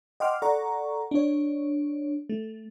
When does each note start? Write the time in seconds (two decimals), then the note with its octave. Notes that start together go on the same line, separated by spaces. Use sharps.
0.20 D#5 F#5 G5 C6 D6 F6
0.42 A4 D5 F#5 A#5 C#6
1.11 D4 C#5
2.30 A3